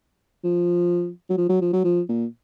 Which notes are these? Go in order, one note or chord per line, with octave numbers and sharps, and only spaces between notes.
F3
F#3
F3
F#3
F3
F#3
F3
A#2